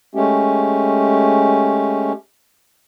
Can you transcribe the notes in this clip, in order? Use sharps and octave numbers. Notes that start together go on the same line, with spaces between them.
G#3 A3 C#4 G4